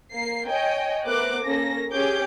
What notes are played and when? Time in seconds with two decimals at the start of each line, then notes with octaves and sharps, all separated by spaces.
0.13 A#3 C7
0.48 C#5 D#5 G5 G#5
1.07 A3 B3 A#4 C5 D6 F#6
1.44 A#3 C#4 A4 A#6
1.93 C#4 G4 G#4 C#5 D6 G6